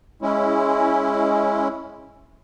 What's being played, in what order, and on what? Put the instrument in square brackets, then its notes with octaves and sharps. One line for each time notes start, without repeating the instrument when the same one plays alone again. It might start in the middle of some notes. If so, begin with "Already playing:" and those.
[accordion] G#3 C#4 E4